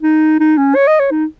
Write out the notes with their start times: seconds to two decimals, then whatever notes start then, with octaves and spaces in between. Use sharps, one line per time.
0.03 D#4
0.40 D#4
0.57 C#4
0.76 C#5
0.87 D#5
1.00 C#5
1.11 D#4